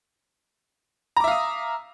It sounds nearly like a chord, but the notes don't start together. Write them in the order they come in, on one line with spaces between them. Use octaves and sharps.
A#5 D6 E5 F5 D#6